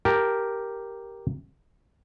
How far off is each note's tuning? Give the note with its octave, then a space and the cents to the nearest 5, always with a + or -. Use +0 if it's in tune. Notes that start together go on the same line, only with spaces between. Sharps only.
G4 +0 A#4 +0 A5 +0